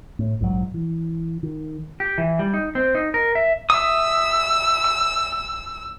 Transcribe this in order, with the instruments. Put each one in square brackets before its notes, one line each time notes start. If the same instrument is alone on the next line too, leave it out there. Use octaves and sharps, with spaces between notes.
[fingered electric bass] A2
A#1 G#2 D#3 F#3
E3
D#3
[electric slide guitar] G4
E3
G3
D#4
C4
D#4
A#4
E5
[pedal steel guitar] E5 D#6 [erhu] E6